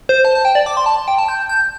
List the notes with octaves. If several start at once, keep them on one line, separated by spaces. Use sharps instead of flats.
C5
A5
A5
G5
D5
D6
C6
A5
G5
A5
G6
G6